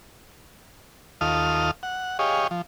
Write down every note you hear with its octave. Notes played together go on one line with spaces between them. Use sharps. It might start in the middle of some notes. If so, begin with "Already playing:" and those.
D#2 F4 A4 D#6 F6
F#5
G4 G#4 C#5 D#5 F5
F3